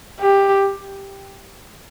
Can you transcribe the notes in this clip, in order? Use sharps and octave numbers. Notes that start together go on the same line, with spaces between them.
G4